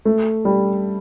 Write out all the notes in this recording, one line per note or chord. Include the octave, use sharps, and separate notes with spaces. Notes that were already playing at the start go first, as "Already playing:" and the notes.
A3
G3